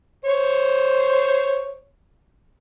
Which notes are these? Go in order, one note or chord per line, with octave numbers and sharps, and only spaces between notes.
C5 C#5